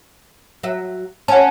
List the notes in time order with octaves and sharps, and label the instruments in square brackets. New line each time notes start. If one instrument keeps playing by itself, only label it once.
[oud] F#3 E5
[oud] C#4 [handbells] F#5 G#5 A5